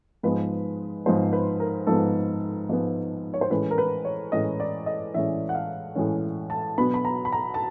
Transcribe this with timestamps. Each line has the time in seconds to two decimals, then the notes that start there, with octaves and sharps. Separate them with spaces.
0.23 G#2 F3 G#3 B3 B4
1.06 G#2 F3 G#3 B3 C5
1.33 B4
1.60 A#4
1.87 G#2 F3 G#3 B3 A4
2.69 G#2 F3 G#3 B3
3.34 C#5
3.41 C5
3.50 A2 E3 G#3 C#4 B4
3.71 A#4
3.78 B4
4.05 C#5
4.32 A2 E3 G#3 C#4 D#5
4.60 D5
4.86 D#5
5.14 A2 E3 G#3 C#4 E5
5.49 F#5
5.55 F5
5.95 A2 E3 G#3 C#4
6.50 A5
6.78 B2 F#3 B3 D4 B5
6.94 B5
7.05 A#5
7.25 B5
7.32 A#5
7.54 A5